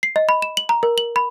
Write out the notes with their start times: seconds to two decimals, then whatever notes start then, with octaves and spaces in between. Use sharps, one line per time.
0.03 C7
0.16 D#5
0.29 B5
0.42 E7
0.57 F#7
0.69 A#5
0.83 A#4
0.98 F#7
1.16 B5